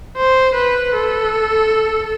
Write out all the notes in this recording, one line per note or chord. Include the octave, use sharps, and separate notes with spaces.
C5
B4
A4